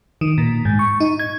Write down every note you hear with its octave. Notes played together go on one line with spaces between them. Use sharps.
D#3
A#2
G#2
C#6
D#4
G#6